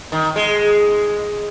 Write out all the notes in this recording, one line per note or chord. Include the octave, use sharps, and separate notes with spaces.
D#3
G#3